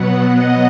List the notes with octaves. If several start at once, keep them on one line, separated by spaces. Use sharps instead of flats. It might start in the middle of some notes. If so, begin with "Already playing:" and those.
Already playing: B2 F#3 B3 F#5
D#5